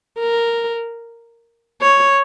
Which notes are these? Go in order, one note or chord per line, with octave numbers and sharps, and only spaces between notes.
A#4
C#5